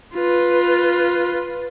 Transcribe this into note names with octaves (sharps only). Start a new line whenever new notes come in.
F4 B4